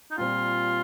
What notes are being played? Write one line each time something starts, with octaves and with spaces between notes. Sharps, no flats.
D#4
A#2 G3 C4 F4